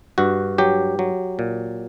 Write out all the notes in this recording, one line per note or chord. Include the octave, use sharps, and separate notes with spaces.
G2 F#4
F#3 G4
F#3
A#2